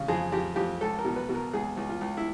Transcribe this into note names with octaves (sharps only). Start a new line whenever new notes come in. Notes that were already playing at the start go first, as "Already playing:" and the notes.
Already playing: C#3
F2 G#4
F2 G4
F2 G4
C#2 A4
A#4
B2
B4
B2
A#4
C#2 G#4
C#2
F4
C#2
E4